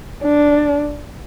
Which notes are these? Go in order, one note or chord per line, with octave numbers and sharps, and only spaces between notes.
D4